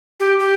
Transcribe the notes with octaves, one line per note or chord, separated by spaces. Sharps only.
G4
G4